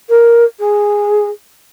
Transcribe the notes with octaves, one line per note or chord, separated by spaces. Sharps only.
A#4
G#4